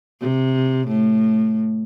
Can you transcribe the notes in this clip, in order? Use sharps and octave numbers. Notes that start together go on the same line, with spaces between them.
C3
A2